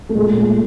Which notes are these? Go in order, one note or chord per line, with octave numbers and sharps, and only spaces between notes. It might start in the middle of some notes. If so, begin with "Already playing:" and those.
A3
A#2 G#3
A#2
A3
A#2